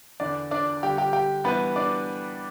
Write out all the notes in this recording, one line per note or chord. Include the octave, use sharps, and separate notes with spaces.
E2 D3 D4 D5
D4 D5
G2 D3 G4
G4
G4
G2 E3 B3 B4
D4 D5